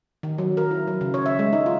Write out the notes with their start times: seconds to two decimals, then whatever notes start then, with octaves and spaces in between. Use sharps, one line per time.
0.23 D#3
0.38 F#3
0.57 A#4
0.71 E4
0.87 F#3
1.01 C#3
1.14 C#5
1.26 E5
1.39 G#3
1.53 D#4
1.66 F4